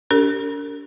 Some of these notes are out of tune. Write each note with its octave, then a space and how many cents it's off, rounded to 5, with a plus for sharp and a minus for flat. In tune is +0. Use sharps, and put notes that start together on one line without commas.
D4 -40 G4 +0 A#4 -35